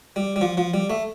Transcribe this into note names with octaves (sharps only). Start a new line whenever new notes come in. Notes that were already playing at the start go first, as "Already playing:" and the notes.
G3
G3
F3
F3
G3
A3